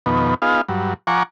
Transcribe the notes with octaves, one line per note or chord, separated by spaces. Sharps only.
F2 B2 D#3 B3
B3 D#4 F4 G#4 F5
G2 F#3
F3 F#5 G#5 A#5 C#6 D6